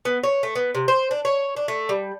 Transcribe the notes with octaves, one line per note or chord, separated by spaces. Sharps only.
B3
C#5
A3
B3
C3
C5
D4
C#5
D4
A3
G3